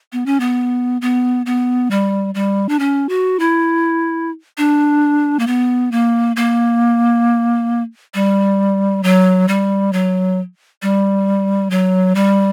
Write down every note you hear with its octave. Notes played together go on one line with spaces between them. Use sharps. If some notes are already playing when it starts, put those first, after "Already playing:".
B3
C#4
B3
B3
B3
G3
G3
D4
C#4
F#4
E4
D4
A#3
B3
A#3
A#3
G3
F#3
G3
F#3
G3
F#3
G3